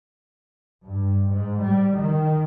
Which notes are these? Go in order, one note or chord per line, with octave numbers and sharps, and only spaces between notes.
G2
G#2
G3
D#3